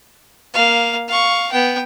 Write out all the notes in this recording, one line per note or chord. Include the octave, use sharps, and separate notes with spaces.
A#3 F5
F5 C#6
B3 G5